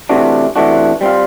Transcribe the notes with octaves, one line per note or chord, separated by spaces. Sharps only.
C3 E3 A3 D4 F#4
C3 E3 A3 D4 F#4
G3 C4 F4